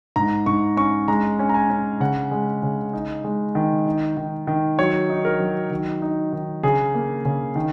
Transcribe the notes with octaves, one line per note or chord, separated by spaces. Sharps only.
G#2 A#5
G#2 C#6
C#4 C#6
G#3 A#5
C#4
A#5
G#5
C#4
C#3 F#5
G#3
C#3
D#4
G#3
D#3
D#4
D#3
D#3
F#3 C#5
D#4
A#4
F#3
D#3
D#4
D#3
C#3 G#4
A#3
C#3
D#3